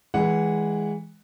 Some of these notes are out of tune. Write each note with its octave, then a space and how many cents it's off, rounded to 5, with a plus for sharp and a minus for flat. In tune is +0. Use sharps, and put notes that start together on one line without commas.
E3 -10 G#3 +0 F#5 +0